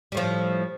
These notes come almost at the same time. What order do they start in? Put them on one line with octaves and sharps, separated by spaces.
G3 A2 F3